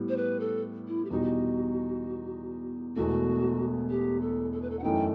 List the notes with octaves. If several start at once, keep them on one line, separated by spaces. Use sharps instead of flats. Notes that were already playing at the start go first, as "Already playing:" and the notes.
Already playing: A2 G3 B3
C5
B4
A4
E4
G4
E2 B2 G3 D#4 F#4
E1 E2 B2 A3 F#4
G4
A4
A4
B4
A4
F#5
F#2 E3 A3 D#4 G5